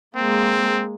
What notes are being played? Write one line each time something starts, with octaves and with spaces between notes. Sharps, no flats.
G#3 A#3 C4